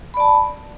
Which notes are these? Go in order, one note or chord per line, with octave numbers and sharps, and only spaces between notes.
D5 A5 B5